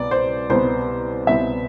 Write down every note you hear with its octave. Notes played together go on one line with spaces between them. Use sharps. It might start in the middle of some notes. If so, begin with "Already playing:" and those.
Already playing: C2 B2 B3 D5
C5
C2 B2 B3 C5
C2 B2 B3 E5